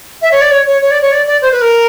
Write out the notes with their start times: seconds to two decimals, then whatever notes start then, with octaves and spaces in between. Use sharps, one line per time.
0.21 E5
0.31 C#5
0.41 D5
0.50 C#5
0.66 C#5
0.81 C#5
0.90 D5
1.01 C#5
1.11 D5
1.26 D5
1.41 C5
1.51 B4
1.61 A#4